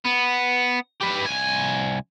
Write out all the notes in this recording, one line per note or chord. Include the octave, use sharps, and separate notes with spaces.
B3
G4 B4
C2 G#5